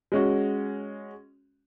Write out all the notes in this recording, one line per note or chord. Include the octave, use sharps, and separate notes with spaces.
G#3 C#4 F#4